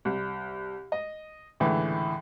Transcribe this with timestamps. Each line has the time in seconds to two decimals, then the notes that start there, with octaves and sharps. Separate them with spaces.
0.05 C2
0.92 D#5
1.60 C#2 A2 D3 E3